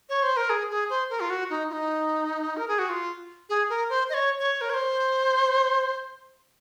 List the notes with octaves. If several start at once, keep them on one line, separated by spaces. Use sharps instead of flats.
C#5
C5
A#4
G#4
G#4
C5
A#4
F4
F#4
D#4
F4
D#4
A#4
G#4
F#4
F4
G#4
A#4
C5
D#5
C#5
C#5
A#4
C#5
C5